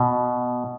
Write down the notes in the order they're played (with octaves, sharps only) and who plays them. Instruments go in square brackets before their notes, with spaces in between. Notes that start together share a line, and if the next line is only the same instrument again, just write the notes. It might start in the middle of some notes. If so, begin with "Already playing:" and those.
Already playing: [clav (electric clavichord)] B2